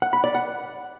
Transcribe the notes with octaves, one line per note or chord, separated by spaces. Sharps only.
F#5
B5
D5
F#5